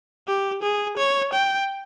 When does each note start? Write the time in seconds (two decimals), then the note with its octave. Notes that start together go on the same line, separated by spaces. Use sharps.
0.27 G4
0.63 G#4
0.97 C#5
1.33 G5